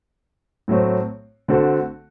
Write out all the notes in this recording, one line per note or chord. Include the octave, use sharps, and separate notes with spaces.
A2 F#3 A3 C4
D3 A3 C4 F#4 A4